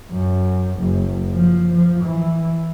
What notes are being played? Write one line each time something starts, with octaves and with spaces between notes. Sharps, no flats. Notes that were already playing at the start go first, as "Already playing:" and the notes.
F#2
F#1
F3
F3
E3